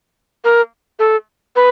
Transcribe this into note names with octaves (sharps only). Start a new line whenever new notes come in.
A#4
A4
B4